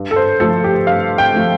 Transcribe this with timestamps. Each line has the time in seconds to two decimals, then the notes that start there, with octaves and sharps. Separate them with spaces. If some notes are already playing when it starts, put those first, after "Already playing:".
Already playing: G2
0.11 A4
0.16 C5
0.40 F3 A3 A4
0.64 G4
0.87 G2 F5
1.18 G5
1.34 F3 A3